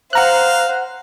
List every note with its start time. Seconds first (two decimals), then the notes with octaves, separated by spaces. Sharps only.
0.13 C5 F5 F#5 A#5 F#6